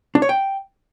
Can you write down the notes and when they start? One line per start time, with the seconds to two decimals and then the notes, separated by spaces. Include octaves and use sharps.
0.15 D4
0.22 C#5
0.29 G5